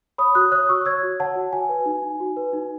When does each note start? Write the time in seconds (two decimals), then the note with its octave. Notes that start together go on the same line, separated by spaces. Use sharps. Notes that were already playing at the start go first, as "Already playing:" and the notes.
0.18 C#5 B5 D#6
0.35 F#4 D#6 F#6
0.52 C#5 D#6 F#6
0.69 F#4 C#6 E6
0.86 C#5 E6 G#6
1.03 F#4
1.20 C#5 F#5 A5
1.35 F#4
1.53 F#4 G#5
1.69 B4
1.86 D#4
2.03 D#4
2.20 F#4
2.37 B4
2.53 D#4